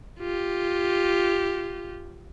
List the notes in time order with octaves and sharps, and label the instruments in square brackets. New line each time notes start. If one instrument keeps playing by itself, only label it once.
[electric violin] F4 G4